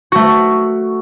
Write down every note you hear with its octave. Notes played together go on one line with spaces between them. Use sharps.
A3 F#4